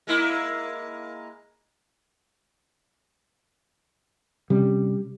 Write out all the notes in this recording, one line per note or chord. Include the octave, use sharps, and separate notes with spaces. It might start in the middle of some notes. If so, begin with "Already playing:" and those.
G#3 A#3 E4
C3 G3 C#4